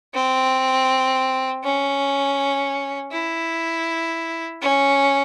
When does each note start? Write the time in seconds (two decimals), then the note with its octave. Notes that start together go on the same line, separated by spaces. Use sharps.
0.14 C4
1.63 C#4
3.11 E4
4.61 C#4